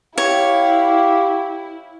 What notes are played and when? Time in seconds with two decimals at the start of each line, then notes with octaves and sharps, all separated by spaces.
0.18 E4 G4 C#5 F5